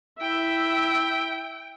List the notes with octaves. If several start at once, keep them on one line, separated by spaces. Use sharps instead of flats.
E4 E5 G5